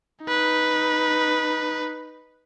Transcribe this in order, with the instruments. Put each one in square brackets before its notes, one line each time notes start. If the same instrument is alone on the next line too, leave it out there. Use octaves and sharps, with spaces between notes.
[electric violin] D#4 B4